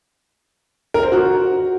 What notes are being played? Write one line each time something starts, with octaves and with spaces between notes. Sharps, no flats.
A#4
C5
F#4